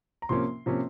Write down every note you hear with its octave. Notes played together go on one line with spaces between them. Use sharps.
A#5
C3 F3 A#3 C#4 C6
C3 F3 A#3 C#4